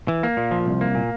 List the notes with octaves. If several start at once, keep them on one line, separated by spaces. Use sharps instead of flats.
E3
A#3
A#2
F3
C2
A#3
A#2